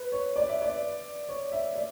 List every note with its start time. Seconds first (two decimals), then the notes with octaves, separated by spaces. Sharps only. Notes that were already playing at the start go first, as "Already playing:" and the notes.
Already playing: B4
0.12 C#5
0.36 D5
0.48 E5
0.62 D5
1.29 C#5
1.52 E5
1.76 D5